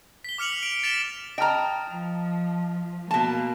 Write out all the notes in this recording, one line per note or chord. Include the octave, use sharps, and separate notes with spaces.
B6 G7
D6 F6 C#7 F7 F#7
D7 F7
A6 B6 D7 E7 F7 G7
D#5 G5 A5 A#5 F6
F3
B2 A#3 A5